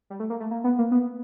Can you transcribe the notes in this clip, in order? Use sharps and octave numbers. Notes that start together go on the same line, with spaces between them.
G3
A3
A#3
A3
A#3
B3
A#3
B3